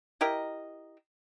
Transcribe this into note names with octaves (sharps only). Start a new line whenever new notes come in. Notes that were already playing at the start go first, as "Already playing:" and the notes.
E4 G4 A#4 D#5